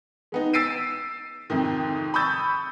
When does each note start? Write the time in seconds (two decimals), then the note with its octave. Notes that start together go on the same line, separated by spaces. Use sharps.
0.32 G#3 B3 D#4
0.53 E6 A6 B6 C7 D7 D#7
1.50 F2 G#2 C3 D#3
2.14 B5 C#6 D#6 E6 G6 A6